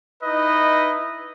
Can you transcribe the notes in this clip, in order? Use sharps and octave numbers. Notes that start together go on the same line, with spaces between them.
D#4 E4 B4 D#5